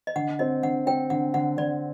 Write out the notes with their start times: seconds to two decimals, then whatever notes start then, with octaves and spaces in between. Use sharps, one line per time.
0.07 D#5
0.16 D3 F#5
0.39 C4 D#5
0.63 D3 F#5
0.87 C4 G5
1.10 D3 F#5
1.34 D3 F#5
1.57 D3 D5